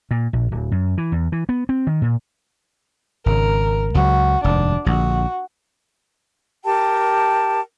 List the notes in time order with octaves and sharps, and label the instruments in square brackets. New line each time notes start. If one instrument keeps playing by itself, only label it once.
[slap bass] A#2
A#1
D1
F#2
E3
E2
E3
B3
C4
D#3
A#2
[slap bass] G#1 C#3 [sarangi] A#4
[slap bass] C#2 F#3 [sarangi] F#4
[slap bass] F1 D#2 G#2 [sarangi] D4
[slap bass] A#1 D3 [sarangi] F#4
[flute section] G4 A#4 G5 A5